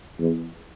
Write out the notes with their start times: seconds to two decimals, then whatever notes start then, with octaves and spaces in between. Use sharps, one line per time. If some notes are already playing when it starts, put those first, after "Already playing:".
0.19 E2